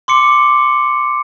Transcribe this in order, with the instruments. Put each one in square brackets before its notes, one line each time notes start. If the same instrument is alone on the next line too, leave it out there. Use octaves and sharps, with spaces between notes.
[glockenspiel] C6 D6 C#7